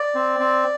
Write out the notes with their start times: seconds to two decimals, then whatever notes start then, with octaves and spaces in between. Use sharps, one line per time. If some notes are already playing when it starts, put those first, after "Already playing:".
Already playing: D5
0.15 C4
0.39 C4